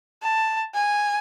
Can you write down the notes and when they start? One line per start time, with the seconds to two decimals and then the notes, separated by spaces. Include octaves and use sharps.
0.22 A5
0.75 G#5